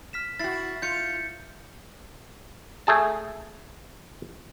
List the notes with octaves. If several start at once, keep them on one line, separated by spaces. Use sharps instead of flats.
F6 B6 E7
E4 F#4 A6 C7
F4 G6 C#7
A3 G#4 A5